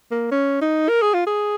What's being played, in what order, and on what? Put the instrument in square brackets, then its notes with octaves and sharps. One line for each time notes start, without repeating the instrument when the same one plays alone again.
[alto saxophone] A#3
C#4
D#4
A#4
G#4
F4
G#4